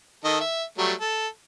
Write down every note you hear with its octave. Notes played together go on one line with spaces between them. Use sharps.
D#3 A4 D#5
E5
F#3 G3 A3
A4